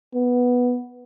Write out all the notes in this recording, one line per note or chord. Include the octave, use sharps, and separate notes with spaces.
B3